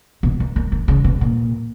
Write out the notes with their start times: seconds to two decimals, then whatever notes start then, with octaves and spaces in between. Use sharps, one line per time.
0.23 B2
0.40 D#3
0.56 D#3
0.72 D#3
0.88 C#3
1.04 B2
1.21 A#2